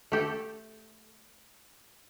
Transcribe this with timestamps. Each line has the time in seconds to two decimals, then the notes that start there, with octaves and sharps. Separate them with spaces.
0.12 A3 G4 A4